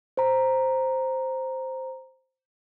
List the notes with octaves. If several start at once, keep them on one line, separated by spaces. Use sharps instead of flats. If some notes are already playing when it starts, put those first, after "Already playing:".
C5 A#5